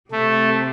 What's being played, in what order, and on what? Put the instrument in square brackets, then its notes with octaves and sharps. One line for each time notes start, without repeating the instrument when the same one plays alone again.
[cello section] C3 [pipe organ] A3